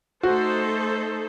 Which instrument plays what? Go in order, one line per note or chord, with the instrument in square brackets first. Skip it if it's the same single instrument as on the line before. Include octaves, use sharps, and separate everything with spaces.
[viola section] A3 D#4 A4 C5 [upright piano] F#4